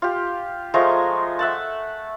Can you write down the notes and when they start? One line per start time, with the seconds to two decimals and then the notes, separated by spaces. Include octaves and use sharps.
0.02 F4 G4
0.74 F3 G#3 A3 A#5
1.39 E5 F#5 A5